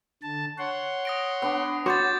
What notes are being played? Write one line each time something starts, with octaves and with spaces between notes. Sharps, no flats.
D3 A5
C#5 F#5 C6
D#6 A#6 D7
B3 D4
F#4 C#5 C6 D6 G6 A6